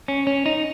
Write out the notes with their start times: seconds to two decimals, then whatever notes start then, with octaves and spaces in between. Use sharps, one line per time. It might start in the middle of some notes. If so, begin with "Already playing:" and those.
0.08 C#4
0.27 C#4
0.46 D#4